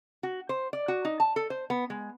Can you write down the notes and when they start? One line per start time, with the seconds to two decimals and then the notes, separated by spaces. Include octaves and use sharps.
0.23 F#4
0.49 C5
0.73 D5
0.88 F#4
1.05 D#4
1.20 A5
1.36 A4
1.50 C5
1.70 B3
1.90 G#3